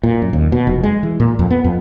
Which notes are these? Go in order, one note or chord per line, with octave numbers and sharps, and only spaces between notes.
A#2
F#2
D#2
B2
F1
G#3
E3
A#2
F2
B3
F2